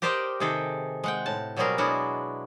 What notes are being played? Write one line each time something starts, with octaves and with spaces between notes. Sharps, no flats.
G4 A#4 C5 D5 D#5 G5
C3 D#3 G#4 A4 G5
G#3 F#5 G5
A2 A5
B2 F#3 G3 C4 G#4 A#4
F#3 G#3 B3 D4 E4 F#4